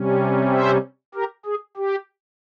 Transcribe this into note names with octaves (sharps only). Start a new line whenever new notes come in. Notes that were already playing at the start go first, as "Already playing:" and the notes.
Already playing: C3 G3 C#4
C5 E5
G4 A#4
G#4
G4